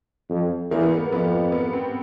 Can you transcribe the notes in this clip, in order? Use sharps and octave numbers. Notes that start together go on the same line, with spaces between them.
F2
E2 A#3
B3
A#3
F2 B3
B3
C4